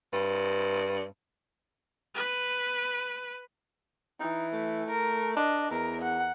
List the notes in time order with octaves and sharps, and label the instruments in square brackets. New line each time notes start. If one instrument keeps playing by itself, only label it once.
[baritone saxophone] G2
[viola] B4
[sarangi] E3 [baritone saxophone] D#4
[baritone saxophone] A3
[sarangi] A#4
[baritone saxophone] D4 [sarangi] D#5
[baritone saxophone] E2 [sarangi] A#4
[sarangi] F#5